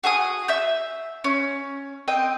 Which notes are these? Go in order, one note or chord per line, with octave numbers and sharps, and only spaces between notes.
F#4 G#4 G#5 D#6
E5 E6 G6
C#4
C4 D#5 G5